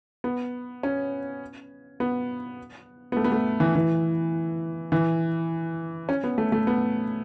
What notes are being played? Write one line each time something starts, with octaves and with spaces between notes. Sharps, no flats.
B3
C#4
B3
B3
A3
B3
A3
E3
E3
E3
C#4
B3
A3
A3
B3